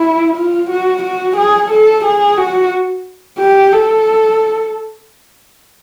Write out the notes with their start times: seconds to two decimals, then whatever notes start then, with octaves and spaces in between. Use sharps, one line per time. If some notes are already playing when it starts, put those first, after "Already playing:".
Already playing: E4
0.36 F4
0.71 F#4
1.03 F#4
1.37 G#4
1.71 A4
2.05 G#4
2.38 F#4
3.39 G4
3.72 A4